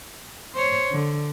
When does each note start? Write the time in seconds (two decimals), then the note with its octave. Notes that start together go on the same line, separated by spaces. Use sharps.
0.55 C5 C#5
0.92 D3